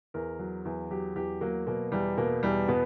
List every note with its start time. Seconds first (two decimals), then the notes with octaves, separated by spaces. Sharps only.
0.14 E2 A#4
0.39 F#3
0.65 E2
0.91 F#3 G4
1.15 E2 G4
1.41 F#3 A#3
1.67 B2 A#3
1.92 E2 G3
2.18 B2 A#3
2.43 E2 G3
2.68 B2 B3